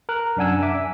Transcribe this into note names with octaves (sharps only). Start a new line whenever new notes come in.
A#4 F#6
F#2 C3 D4 F#5 G#5 E6
E5 G#5 D6